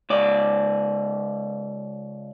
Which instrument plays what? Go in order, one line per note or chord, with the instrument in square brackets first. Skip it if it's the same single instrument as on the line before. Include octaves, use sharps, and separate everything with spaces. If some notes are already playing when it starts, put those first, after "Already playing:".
[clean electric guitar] C#2 D5